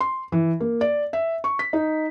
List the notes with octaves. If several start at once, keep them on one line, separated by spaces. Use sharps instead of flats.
C6
E3
A#3
D5
E5
C#6
B6
D#4